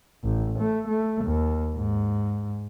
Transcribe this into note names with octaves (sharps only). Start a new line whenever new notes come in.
A1
A3
A3
D#2
G#2